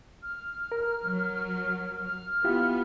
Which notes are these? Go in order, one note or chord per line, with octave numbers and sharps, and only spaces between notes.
F6
A#4
F#3
F6
B3 E4 F4 G4